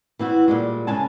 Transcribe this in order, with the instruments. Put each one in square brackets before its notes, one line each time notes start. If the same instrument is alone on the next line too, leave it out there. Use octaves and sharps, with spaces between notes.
[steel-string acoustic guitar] E3 C4 E4 F#4
A#2 G3 G#3
G#2 C#3 G#3 G#5 A5